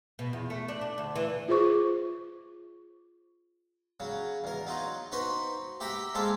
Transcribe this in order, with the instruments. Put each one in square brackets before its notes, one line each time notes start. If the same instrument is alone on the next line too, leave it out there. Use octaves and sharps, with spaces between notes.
[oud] B2
E2
A3
D4
D4
D2
E3
[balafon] F4 G#4 C5 C#6 D6
[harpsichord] C#3 F#3
E2 A#4
F#3 D#4 F4
D#4 F#4 B4 C5 C#6
G4 E5 F#5 G5 A#5 B5
G#3 A#3 C4 A4 E5 F5